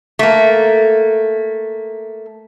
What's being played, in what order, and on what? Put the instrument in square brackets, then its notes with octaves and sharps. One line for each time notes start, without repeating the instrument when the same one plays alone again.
[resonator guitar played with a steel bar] A3 A#3